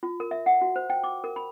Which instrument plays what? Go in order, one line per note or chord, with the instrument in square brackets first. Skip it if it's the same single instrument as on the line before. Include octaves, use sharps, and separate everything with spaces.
[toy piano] F4
A#4
E5
F#5
F#4
C5
G5
D6
A#4
B5